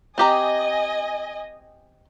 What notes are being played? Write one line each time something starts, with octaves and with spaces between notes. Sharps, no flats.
C4 G4 D#5 G#5 A#5